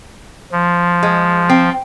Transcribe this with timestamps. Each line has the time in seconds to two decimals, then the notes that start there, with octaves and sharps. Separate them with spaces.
0.52 F3
1.03 G#3
1.50 C4